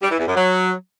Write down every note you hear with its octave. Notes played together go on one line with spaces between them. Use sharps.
G3
E3
E2
F#2
F#3